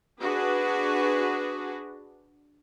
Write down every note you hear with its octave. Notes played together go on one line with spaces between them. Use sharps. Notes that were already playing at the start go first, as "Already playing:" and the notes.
D4 F#4 G#4 B4